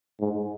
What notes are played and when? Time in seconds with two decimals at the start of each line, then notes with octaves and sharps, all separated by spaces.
0.20 G#2